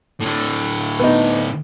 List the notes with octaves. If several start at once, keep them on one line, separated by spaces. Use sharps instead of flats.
A2 D3
B3 D#4